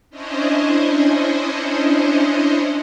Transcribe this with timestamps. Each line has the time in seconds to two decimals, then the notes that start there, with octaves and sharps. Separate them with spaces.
0.10 C#4 D4 E4 C5 C#5 D#5